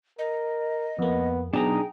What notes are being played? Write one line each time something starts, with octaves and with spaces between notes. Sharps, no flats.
A#4 D#5
F2 A#3 B3
B2 F#3 B3 D4 D#4 G#4 G5 A#5